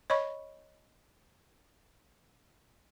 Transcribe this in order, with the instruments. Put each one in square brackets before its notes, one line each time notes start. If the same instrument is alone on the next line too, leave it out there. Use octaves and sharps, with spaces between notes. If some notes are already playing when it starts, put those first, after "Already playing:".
[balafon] C#5 D#5 B5 C#6